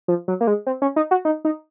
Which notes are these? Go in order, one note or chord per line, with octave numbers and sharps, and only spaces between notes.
F3
F#3
A#3
G#3
C4
C#4
D#4
F#4
D#4
D#4